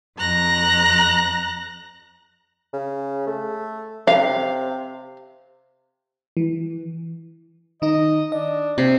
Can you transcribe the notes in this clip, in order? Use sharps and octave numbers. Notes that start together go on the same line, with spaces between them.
F2 A#5 F#6 A#6
C#3
A3
C3 F5
E3
D#3 D#4 D#5
D4 D#5
C3 C4 C7